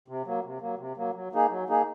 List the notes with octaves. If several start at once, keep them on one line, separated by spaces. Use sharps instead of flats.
C3
F#3 A#3
C3
F#3 A#3
C3
F#3 A#3
F#3
A#3 D#4 G#4
F#3
A#3 D#4 G#4